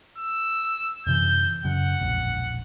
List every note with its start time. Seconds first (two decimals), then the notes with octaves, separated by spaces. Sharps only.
0.18 E6
1.07 F#2 C3 E3 G6
1.65 F#2 C#3 F#5
2.01 E1 A#1